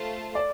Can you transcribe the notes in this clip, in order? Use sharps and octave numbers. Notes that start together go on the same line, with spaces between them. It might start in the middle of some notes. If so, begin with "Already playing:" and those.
Already playing: A3 F4 C5 A5
D5